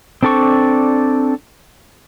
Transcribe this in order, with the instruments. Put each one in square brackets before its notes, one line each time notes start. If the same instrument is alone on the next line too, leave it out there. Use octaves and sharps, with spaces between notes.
[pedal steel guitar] C4 D4 A4 D5 C#6